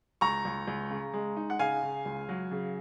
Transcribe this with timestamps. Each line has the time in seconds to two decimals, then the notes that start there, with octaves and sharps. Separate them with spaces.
0.21 C#2 A#5 C#6
0.45 C#2
0.67 C#2
0.91 C#3
1.14 G#3
1.37 D#4
1.50 F#5
1.59 C#3 F5 G#5
1.83 C#3
2.05 C#2
2.29 F#3
2.51 C#3